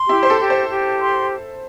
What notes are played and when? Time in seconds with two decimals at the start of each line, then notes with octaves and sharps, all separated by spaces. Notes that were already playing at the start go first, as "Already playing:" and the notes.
Already playing: C6
0.09 E4 G4
0.23 C5
0.30 A4
0.40 G4
0.50 C5
0.70 G4
1.01 C6